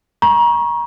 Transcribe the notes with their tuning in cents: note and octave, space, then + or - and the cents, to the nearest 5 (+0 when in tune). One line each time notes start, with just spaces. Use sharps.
A#5 +30 C#6 -10